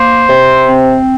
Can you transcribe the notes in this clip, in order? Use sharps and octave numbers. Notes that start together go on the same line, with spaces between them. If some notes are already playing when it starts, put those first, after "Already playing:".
Already playing: A#3 C5
C3
C4